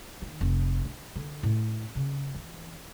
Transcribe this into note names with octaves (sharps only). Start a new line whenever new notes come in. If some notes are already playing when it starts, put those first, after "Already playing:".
D#3
F1
D4
D3
A2
C#3
E3